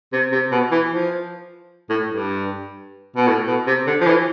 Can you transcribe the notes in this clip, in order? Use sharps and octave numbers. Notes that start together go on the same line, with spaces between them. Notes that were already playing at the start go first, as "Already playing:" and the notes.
C3
C3
B2
E3
F3
A2
G2
B2
A2
B2
C3
D3
F3
E3